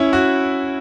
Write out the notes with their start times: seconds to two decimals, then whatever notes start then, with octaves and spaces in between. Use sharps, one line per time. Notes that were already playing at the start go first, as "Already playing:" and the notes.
Already playing: C#4 E4
0.13 F#4